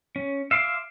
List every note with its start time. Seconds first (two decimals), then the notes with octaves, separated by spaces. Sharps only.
0.16 C#4
0.51 E5 F5 C6 D6